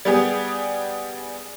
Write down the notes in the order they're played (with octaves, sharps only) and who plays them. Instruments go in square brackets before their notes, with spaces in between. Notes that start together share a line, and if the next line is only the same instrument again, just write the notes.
[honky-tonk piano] G3 B3 G4 G#4